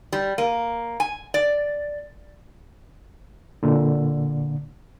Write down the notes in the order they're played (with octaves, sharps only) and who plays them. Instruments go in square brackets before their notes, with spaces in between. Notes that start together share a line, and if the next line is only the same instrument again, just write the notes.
[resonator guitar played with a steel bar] G3
A#3
G#5
D5
[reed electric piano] A#2 D3